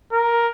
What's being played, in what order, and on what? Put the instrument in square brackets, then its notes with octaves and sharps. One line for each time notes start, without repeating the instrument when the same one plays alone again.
[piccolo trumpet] A#4